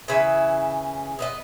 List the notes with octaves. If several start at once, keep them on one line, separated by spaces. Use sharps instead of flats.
C#3 E3 B4 E5
B3 B4 D#5